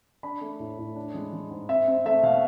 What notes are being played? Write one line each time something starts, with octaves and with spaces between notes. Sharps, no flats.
D4 B5
A3
A2
A2
D4
G#3
G#3
G#2
C4 E5
C4
A3 E5
B2 F5